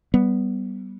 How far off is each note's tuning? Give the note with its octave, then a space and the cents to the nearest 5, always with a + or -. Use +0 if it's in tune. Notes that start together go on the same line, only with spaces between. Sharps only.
G3 -20 B3 +0